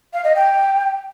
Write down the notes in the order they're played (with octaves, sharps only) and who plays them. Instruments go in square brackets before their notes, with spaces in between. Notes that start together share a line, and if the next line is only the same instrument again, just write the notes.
[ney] F5
D#5
G5